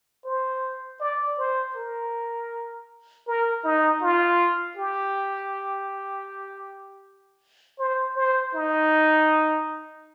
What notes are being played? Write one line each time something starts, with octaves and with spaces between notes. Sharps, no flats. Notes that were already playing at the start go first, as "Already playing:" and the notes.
C5
D5
C5
A#4
A#4
D#4
F4
G4
C5
C5
D#4